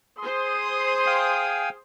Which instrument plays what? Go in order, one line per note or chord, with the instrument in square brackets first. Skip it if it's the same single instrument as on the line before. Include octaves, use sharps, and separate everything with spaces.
[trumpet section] G#4 D#6 [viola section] C5 C6
[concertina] F5 G5 G#5